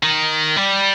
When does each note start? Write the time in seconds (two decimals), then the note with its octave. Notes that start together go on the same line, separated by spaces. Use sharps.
0.03 D#3
0.56 G3